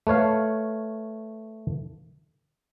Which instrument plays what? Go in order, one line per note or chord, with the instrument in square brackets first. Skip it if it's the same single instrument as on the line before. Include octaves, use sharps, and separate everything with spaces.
[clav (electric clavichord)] A3 B4 C#5 F5